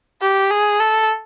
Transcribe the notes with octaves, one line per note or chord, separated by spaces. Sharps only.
G4
G#4
A4